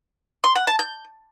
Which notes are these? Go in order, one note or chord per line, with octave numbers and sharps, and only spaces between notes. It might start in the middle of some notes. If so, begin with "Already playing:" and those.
C6
F#5
A5
G6